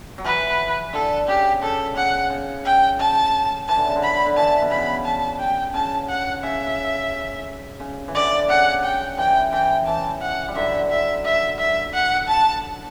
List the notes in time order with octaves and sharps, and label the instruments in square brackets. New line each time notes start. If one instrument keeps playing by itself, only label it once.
[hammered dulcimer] F#3
[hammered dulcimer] E3 [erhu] B4
[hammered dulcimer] D3 [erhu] A4
[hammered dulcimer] C#3 [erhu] G4
[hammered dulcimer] C#3 [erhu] A4
[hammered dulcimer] C#3 [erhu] F#5
[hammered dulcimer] C#3
[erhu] G5
[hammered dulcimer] C#3 [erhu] A5
[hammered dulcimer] E3 [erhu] A5
[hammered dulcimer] D3
C#3
D3
[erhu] B5
[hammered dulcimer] D3
[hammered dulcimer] E3 [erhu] A5
[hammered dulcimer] B2
[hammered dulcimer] C#3 [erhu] B5
[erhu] A5
G5
[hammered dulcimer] C#3 [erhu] A5
[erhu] F#5
[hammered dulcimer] C#3 [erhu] E5
[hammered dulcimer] C#3
E3
[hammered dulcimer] D3 [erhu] D5
[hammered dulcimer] C#3 [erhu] F#5
[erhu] G5
[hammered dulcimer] E3 [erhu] G5
[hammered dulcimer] E3 [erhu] G5
[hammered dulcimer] E3 [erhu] A5
[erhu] F#5
[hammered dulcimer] G3
[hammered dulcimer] D3 F#3 [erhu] E5
[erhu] E5
E5
E5
F#5
A5